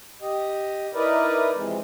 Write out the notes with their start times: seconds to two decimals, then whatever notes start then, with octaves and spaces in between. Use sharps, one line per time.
0.22 G4 D#5
0.94 D#4 E4 A#4 B4 D5 D#5
1.54 F2 C3 E3 G#3